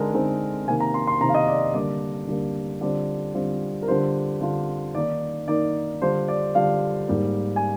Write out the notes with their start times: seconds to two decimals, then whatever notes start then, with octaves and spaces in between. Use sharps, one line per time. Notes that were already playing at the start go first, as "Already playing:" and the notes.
Already playing: D3 G#3 C4 D#4 A#4
0.14 D3 G#3 C4 D#4
0.68 C3 D#3 A#3 G#5
0.80 A#5
0.94 C6
1.07 C6
1.21 C3 D#3 A#3 A#5
1.29 F5
1.34 D#5
1.48 D5
1.74 D3 G3 A#3 D4 D5
2.27 D3 G3 A#3 D4
2.81 D3 G3 C4 F4 D5
3.34 D3 G3 C4 F4
3.82 A#4
3.88 D3 G3 D4 F4 C5
4.41 D3 G3 D4 F4
4.95 D#3 A#3 D#4 D5
5.48 D#3 A#3 D#4 D5
6.02 D3 G3 D4 F4 C5
6.28 D5
6.55 D3 G3 D4 F4 F5
7.08 G#2 G3 A#3
7.56 G#5